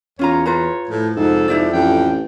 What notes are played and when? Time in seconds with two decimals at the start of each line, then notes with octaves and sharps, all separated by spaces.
0.19 E2 C#4 F4 C#5 A#5
0.46 F4 B4 A#5
0.89 A2 F3
1.17 F2 G#2 C3 A4
1.48 G#2 E4 G4 D5
1.74 A1 F2 G5